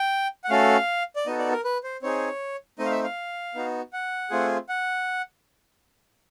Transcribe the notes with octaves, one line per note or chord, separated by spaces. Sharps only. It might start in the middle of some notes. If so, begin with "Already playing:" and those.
Already playing: G5
F#5
A3 C#4 F#4 A4 F5
D5
B3 D#4 F#4 A4 D#5
D5
A#4
B4
C5
C4 D#4 G#4 C#5
A3 C4 D#4 D#5
F5
E5
F5
B3 D#4 F#4
F#5
A3 C4 F4 G#4
F#5